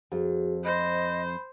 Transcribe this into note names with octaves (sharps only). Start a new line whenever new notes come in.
F2 F#4 G#4
C5 D#5 B5